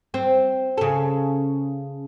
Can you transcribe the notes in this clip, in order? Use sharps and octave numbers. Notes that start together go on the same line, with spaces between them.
C4
C#3 A4